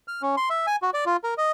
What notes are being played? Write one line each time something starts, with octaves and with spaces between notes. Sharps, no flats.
F6
C#4
C6
E5
G#5
F#4
D5
F4
A#4
D#5